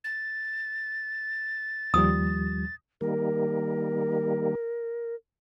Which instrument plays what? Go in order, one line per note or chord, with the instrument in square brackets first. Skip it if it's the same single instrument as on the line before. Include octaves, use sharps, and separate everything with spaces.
[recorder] A6
[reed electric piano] D#2 F3 G3 [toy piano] D#6
[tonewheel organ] D#3 G3 A#3 [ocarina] A#4